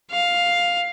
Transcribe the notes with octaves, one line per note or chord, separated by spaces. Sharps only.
F5